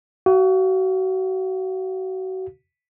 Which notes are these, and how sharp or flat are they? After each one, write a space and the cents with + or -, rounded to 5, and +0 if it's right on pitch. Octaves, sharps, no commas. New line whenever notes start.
F#4 +30 F5 -10